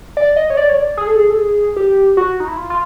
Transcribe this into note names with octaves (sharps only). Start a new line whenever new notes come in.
D5
D#5
C#5
D5
C#5
D5
G#4
A4
G#4
A4
G#4
G4
F#4
D#4
E4
F4
F4